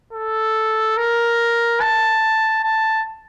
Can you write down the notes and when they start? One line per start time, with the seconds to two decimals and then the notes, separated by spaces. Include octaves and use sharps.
0.13 A4
0.97 A#4
1.81 A5
2.64 A5